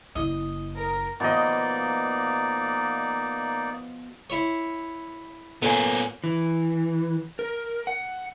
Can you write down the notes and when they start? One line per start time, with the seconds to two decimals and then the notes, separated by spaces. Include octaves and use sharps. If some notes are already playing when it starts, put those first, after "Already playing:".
0.15 F#1 E4 D#5
0.76 A#4
1.20 B2 F3 A#3 D#4 D5 D#5
4.30 E4 C#5
5.62 A#2 B3 A4 A#4 C#5 G#5
6.24 E3
7.39 A#4
7.87 F#5